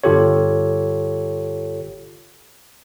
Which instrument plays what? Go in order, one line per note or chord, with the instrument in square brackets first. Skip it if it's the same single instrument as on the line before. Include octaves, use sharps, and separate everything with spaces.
[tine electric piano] G1 F4 G4 A4 C#5